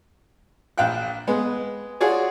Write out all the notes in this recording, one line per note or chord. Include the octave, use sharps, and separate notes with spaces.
A#1 F5 G5 F#6
G#3 B3
F4 F#4 G#4 C#5 D5